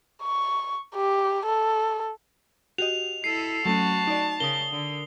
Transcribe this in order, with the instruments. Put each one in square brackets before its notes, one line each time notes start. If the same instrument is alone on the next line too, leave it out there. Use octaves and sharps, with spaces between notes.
[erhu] C#6
G4
A4
[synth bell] F#4 G4 D#5 [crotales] F7
[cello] E4 A4 [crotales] C7 [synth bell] C#7 D#7
[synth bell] F#3 A3 C#4 [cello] F#4 [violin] A5
[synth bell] D#4 D5
[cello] C#3 [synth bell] A#4 D#6 [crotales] G7
[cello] D3